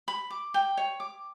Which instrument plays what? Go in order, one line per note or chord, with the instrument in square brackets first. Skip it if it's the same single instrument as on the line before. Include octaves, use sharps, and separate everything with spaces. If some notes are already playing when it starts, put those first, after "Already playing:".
[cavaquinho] B5
D6
G5
C#5
D6